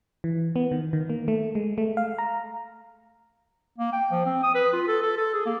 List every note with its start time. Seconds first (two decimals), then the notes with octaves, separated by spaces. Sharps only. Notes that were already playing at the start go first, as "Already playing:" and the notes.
0.24 E3
0.56 B3
0.72 D#3
0.93 D#3
1.10 A#3
1.28 A3
1.55 G#3
1.78 A3
1.97 F5
2.18 A#5
3.78 A#3
3.93 G5
4.11 F3
4.26 C4
4.43 D#6
4.55 B4
4.73 F4
4.88 A4
5.03 A4
5.17 A4
5.34 G#4
5.46 A#3